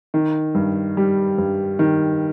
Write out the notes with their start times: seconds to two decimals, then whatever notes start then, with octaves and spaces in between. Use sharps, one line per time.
0.14 D#3
0.55 G2
0.97 G3
1.38 G2
1.79 D#3